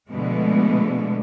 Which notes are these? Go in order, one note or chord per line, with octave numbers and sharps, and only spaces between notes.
B2 D3 F3 G#3 A3 B3